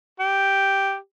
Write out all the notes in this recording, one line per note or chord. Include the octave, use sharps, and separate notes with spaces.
G4